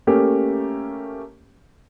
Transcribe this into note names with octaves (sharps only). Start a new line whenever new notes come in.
A3 A#3 C#4 G4 A#4